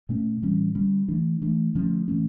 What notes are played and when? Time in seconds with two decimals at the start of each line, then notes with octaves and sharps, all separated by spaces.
0.09 A#2 A3 C#4
0.42 A2 E3 G3 C#4
0.75 D3 G3 C#4
1.08 E3 A3 D4
1.42 E3 A3 D4
1.75 D3 F3 A3 C#4
2.08 A2 E3 A3 C#4